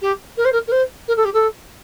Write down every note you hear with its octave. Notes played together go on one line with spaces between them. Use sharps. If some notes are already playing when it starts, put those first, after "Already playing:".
G4
A#4
C5
A#4
A#4
C5
A#4
A4
G4
A4